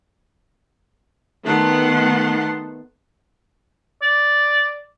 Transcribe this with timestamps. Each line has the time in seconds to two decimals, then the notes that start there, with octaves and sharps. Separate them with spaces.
1.43 D#3 A3 B3 F#5 A5 C6
4.02 D5